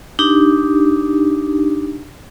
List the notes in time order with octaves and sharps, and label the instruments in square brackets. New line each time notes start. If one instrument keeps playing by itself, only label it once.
[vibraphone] D4 D#4 G4